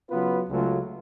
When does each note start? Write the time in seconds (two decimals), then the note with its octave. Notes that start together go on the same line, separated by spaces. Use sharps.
0.10 C#3 F#3 B3 F4 B4
0.49 C#2 C#3 F#3 A3 F4